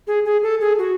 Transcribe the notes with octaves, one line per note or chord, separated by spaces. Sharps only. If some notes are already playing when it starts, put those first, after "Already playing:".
G#4
G#4
A4
G#4
F#4